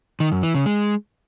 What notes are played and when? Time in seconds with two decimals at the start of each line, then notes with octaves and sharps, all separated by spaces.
0.20 D#3
0.32 F#2
0.43 E3
0.55 C#3
0.66 G#3